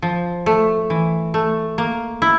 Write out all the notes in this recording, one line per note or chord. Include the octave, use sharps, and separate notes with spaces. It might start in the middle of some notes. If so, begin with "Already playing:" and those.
F3
A3
E3
A3
A#3
E4